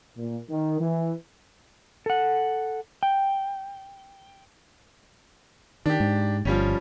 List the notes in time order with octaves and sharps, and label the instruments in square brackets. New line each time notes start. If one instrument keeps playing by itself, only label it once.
[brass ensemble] A#2
D#3
E3
[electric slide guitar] A4 F#5
G5
[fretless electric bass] D#3 [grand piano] D4 G4
[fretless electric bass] G#2
[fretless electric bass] G1 [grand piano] F3 G3 C#4